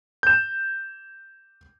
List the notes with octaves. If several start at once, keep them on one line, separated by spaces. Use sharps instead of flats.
G6 E7